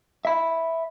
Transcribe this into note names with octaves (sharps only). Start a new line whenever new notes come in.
E5 B5